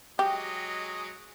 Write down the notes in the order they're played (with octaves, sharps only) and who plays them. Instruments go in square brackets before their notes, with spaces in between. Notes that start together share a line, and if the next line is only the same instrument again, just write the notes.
[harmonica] F#3 G#3 D#5 [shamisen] G4